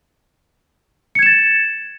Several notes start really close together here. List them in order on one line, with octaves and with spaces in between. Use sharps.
C#7 G#6 E7 A6